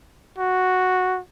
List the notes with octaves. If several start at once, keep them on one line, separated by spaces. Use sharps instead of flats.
F#4